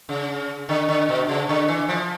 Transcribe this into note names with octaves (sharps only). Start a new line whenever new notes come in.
C#3
D3
D3
B2
C#3
D3
E3
F3